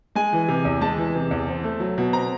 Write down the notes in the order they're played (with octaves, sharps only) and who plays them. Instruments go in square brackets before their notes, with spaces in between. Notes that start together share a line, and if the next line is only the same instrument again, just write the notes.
[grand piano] G#3 G#5
E3
C3
E2
G#3 A5
E3
C3
E2
C4
A3
F#3
B2
C4 A#5